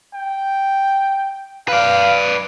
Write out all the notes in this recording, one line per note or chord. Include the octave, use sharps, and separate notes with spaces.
G5
B4 D5 F5